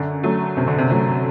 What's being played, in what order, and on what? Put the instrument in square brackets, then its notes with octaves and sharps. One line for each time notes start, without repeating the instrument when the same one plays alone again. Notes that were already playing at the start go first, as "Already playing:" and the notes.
Already playing: [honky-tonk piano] F#2 [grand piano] D3
[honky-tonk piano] F#3 A3
[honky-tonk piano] F#2 [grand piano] C3
[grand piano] D3
C3
[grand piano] C3 [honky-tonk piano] F#3 A3